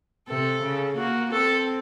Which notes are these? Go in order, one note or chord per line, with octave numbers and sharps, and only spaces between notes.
C3 A4
C#3
A#3 F#4
C4 A4